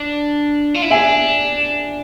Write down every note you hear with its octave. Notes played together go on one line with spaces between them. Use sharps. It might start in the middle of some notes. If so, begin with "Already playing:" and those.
Already playing: D4
F4
E4
D4 E5 G#5